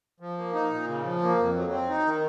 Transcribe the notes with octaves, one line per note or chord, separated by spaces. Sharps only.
F3
A#3
D#4
A#2
C#3
F3
A#3
F2
F#3
C4
D#4
D#3